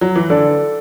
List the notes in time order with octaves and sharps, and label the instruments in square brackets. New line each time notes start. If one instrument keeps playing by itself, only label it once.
[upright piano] F#3
E3
[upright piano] D3 [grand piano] A4 D5